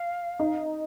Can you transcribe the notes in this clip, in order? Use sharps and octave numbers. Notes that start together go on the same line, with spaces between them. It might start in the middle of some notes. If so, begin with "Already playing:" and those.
Already playing: F5
D#4